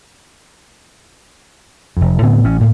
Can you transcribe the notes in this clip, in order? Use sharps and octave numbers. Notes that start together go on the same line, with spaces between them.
F1 F2
A2 D3 B3 C4
A1 C#4
D2 A2 A#3